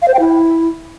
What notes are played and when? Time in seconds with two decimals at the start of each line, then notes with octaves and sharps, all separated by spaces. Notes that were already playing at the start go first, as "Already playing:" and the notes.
0.02 F5
0.08 C5
0.14 G5
0.20 E4